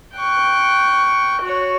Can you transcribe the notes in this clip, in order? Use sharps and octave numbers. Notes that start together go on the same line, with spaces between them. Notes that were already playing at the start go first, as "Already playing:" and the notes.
G5 C#6 F#6
F#4 C#5